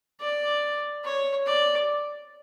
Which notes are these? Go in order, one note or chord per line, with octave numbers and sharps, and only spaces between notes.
D5
C#5
D5